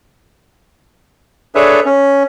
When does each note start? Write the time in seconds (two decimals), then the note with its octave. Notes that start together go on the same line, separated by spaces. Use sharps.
1.55 D4 G#4 A4 B4 C#5 E5
1.86 C#4